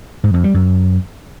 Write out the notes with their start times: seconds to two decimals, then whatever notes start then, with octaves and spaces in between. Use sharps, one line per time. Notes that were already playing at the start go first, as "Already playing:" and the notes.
0.24 G#2
0.34 F2
0.44 G3
0.54 F#2